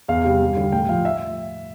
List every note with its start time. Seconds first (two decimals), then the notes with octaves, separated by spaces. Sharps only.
0.08 E2 F5
0.24 C3 G3
0.41 G2
0.57 D3 G3
0.72 A2 G5
0.89 F3 F5
1.05 E5